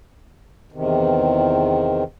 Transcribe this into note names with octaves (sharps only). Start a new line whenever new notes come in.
E2 C3 D#3